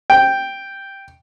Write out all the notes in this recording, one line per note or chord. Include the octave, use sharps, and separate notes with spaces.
G5